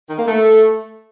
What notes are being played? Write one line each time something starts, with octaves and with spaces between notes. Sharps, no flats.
D#3
A#3
A3